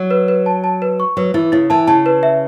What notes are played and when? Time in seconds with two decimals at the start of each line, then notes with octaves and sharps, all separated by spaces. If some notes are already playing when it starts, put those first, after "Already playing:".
Already playing: F#3
0.10 B4
0.28 B4
0.46 A5
0.64 A5
0.82 B4
1.00 C#6
1.17 F#3 B4
1.34 E3 E4
1.52 C#3 E4
1.70 E3 A5
1.87 C#3 A5
2.06 B4
2.23 E5